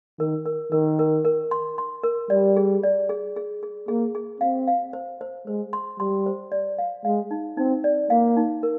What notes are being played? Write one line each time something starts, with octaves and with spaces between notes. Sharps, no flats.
D#3 A#4
A#4
D#3 A#4
A#4
A#4
C6
C6
A#4
G3 D5
G#4
D5
G#4
G#4
G#4
A#3 G#4
G#4
C4 F5
F5
C5
C5
G#3 C5
C6
G3 C6
C5
D5
F5
G#3 F5
D#4
C4 D#4
D5
A#3 F5
D#4
A#4